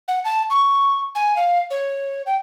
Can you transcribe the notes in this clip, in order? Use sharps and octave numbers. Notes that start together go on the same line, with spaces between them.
F#5
A5
C#6
G#5
F5
C#5
G5